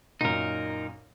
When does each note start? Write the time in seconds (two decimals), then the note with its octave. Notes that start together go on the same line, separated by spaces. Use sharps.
0.21 F#2 A#2 D#4 A#4